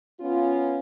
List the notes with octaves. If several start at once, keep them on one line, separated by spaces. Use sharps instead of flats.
B3 C#4 F4